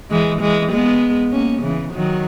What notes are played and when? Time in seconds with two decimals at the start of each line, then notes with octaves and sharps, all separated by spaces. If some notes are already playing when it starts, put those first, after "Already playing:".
0.11 E3 G#3
0.41 E3 G#3
0.71 G#3 B3
1.32 A#3 C#4
1.62 C#3 E3
1.93 D#3 F#3